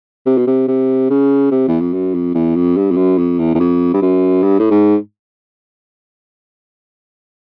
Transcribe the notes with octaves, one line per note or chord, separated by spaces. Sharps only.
C3
B2
C3
C3
C#3
C3
E2
F2
F#2
F2
E2
F2
G2
F2
F#2
F2
E2
E2
F2
G2
F#2
G2
A2
G#2